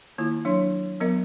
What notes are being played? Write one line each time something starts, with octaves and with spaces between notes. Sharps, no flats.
D#3 A#3 E4 F4
F#3 D4 C#5 C6
F#3 B3 A#4 D#5